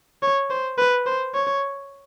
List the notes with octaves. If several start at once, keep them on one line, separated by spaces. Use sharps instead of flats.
C#5
C5
B4
C5
C#5